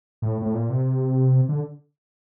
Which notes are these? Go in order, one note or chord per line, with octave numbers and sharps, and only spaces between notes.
A2
A2
A#2
C3
D3